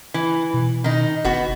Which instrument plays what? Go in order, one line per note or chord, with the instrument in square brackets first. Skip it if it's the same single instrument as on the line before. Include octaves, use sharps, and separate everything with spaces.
[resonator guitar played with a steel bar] E3
[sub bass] B2
[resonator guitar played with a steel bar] D#3 D#4
[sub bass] F#1 [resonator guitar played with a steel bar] B3 F#4